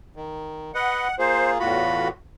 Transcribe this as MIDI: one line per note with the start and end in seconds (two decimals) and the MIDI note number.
0.16 0.71 51
0.75 1.08 71
0.75 1.08 75
0.75 1.15 78
1.19 1.58 58
1.19 1.58 65
1.19 1.58 68
1.19 1.51 72
1.59 2.09 40
1.59 2.09 45
1.59 2.08 65
1.59 2.09 66
1.59 2.08 83